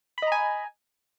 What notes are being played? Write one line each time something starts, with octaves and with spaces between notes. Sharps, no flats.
D#5 G#5 A#5 B5